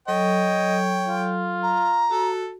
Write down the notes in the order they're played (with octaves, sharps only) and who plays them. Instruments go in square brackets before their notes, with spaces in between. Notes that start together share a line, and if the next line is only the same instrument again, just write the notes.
[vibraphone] F#3 A4 [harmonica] C#5 G5 [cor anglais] D#5
[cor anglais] F4
[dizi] A#5
[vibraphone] F#4 [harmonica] A4